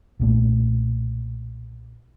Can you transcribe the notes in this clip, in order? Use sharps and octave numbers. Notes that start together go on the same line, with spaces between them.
B1 A#2 A3